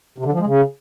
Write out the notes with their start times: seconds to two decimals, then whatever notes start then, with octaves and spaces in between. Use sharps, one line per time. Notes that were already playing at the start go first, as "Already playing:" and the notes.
0.18 C3
0.25 D3
0.33 F3
0.40 G#3
0.47 C#3